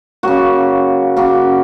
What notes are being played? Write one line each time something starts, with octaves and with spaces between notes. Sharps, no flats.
C#3 F#3 A#3 F#4
C#3 F#3 A#3